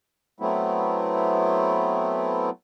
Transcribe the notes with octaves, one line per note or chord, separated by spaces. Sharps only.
F#3 A3 B3 C4 E4